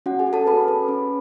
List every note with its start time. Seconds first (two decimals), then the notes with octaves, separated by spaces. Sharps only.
0.06 C#4 F#4 F#5
0.19 G#4 G#5
0.27 C#4
0.33 A4 A5
0.47 C#4 B4 B5
0.68 C#4
0.88 C#4